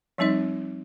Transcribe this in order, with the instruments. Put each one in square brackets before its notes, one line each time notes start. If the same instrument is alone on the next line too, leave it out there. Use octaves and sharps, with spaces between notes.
[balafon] F3 G3 C4 D#4 D#5